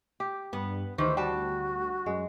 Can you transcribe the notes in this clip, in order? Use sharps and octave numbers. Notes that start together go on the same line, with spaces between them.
G4
G2 B3
D2 D#3 E3 G4 C5
G3 F#4 G5 A5
F#2 G#3